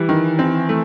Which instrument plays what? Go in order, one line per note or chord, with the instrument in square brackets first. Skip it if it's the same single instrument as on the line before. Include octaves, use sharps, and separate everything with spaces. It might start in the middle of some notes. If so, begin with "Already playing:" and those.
Already playing: [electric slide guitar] E3 [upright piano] G3
[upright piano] D#3
C4
A3